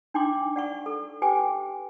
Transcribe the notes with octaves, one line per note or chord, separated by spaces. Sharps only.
D4 D#4 G5 C6 D6
D5 F#5 C#6
A4
G4 B4 G5 G#5 D6